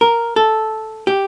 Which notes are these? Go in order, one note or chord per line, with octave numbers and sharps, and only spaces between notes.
A#4
A4
G4